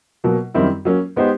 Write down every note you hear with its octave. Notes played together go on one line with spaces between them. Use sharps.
B2 F#3 A#3
F#2 D#3 G3 C4 E4
F#3 A#3 C#4
G#3 B3 D#4 G4 C5